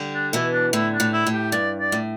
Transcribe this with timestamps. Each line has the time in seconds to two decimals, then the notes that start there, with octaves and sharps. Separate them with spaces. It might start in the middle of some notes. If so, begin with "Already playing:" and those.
Already playing: D3 G3
0.14 D4
0.33 B2 E3 E4
0.53 D4
0.73 A2 D3 E4
0.94 D4
1.00 A2 D3
1.13 E4
1.27 A2
1.33 G4
1.52 G2 D5
1.80 D5
1.92 A2